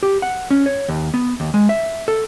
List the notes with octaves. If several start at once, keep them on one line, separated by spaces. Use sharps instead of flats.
G4
F#5
C#4
C#5
D#2
B3
D#2
G#3
E5
A4